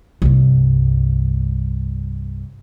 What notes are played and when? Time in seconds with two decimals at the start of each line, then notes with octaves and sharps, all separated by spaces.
0.22 C2 G2